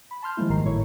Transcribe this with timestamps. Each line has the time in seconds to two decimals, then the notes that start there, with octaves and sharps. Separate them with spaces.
0.11 B5
0.22 A5 C6 F6 G6
0.37 D#3 F3 G3 G#3 A#3 E4
0.49 G#1 G#2 D#3 G#3 A#5 C7
0.65 G#1 A2 E4 C#5 C#6